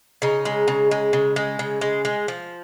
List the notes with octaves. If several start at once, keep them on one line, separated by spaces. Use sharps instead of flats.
C#3 D#4
G#3
C#3
G#3
C#3
G#3
C#3
G#3
G#3
F3